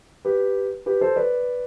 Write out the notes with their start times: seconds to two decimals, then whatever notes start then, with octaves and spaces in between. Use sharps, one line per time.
0.25 G4 B4
0.86 G4 B4
1.01 A4 C5
1.16 B4 D5